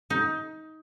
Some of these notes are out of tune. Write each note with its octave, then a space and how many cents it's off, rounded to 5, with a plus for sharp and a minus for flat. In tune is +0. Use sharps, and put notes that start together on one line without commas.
D#4 +20